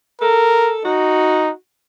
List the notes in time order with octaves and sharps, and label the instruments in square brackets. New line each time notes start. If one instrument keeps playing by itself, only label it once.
[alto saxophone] A4 [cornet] A#4
[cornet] D#4 [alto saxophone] F#4